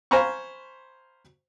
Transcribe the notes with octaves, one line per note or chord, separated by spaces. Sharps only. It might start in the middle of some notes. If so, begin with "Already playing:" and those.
C5 F5 G#5 A#5 B5 C#6